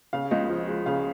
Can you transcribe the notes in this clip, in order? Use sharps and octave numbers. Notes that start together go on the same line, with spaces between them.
C#3 F5
C#2 D#5
F3
G#3
C#3 F5